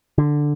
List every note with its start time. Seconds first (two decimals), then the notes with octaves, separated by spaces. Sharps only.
0.18 D3